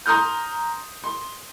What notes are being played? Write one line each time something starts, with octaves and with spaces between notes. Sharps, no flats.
A#5 C6 D#6 F6 G6
C6